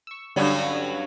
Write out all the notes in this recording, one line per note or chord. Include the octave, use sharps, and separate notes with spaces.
C#6 E6
G2 D3 F#3 G3 C#4 D4